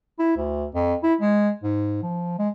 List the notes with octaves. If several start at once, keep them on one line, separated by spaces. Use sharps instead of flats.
E4
D2
F2
E4
G#3
G#2
F3
G#3